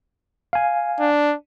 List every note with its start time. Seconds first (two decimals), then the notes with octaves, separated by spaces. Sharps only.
0.53 F5 G#5
0.99 D4